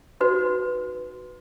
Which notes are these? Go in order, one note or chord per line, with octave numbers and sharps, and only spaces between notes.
D#4 F#4 B4